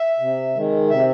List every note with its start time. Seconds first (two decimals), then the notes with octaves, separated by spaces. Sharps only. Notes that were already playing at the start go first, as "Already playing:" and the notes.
Already playing: E5
0.19 C3
0.55 D#3 G#3
0.90 C3 E5